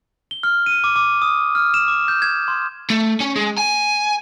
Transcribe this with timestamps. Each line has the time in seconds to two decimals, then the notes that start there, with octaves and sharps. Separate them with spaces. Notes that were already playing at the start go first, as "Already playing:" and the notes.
0.31 G7
0.43 F6
0.66 D#7
0.84 D6
0.96 D6
1.22 D#6
1.55 F6
1.74 E7
1.88 D6
2.08 G6
2.22 G#6
2.48 C6
2.90 A3
3.20 C#4
3.36 G#3
3.58 G#5